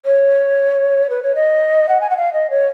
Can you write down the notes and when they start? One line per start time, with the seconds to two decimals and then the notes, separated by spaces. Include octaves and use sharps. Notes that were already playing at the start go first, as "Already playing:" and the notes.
0.05 C#5
1.10 B4
1.23 C#5
1.35 D#5
1.89 F#5
2.01 G#5
2.10 F#5
2.17 F5
2.33 D#5
2.50 C#5